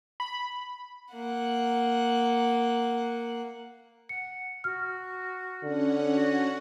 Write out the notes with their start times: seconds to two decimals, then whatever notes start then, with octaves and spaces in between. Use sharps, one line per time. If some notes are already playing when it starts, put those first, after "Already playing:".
0.20 B5
1.14 A#3 F#5
4.09 F#5 C#7
4.64 F#4 F6
5.63 D3 C#4 F#5
6.14 F#4